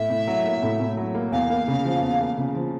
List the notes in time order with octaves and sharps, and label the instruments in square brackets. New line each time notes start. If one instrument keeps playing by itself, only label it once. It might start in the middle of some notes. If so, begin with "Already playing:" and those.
Already playing: [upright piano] A2 [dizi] E5
[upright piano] A2
F#3
A#3
A2
A2
F#3
A#3
[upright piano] E2 [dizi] F5
[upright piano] A#3
C#3
F3
E2
A#3
C#3
F3